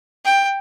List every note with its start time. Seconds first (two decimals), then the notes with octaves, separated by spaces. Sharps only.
0.25 G5